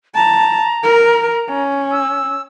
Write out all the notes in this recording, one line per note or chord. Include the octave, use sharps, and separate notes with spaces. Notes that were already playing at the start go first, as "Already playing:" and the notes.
A5 A#5
A#4
C#4
E6